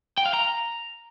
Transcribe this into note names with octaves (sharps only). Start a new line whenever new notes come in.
G5
F5
A#5